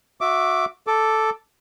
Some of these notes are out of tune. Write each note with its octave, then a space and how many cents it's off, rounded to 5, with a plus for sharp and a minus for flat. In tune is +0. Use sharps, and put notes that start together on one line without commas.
F#4 -25 E5 +0 D6 +0
A4 +0 D6 +0